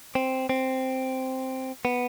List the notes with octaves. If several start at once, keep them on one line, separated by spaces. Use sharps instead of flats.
C4
C4
B3